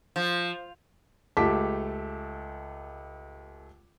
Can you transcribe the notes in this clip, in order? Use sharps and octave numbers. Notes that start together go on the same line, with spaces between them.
F3
C#2 A3 G4 A5 D6 B6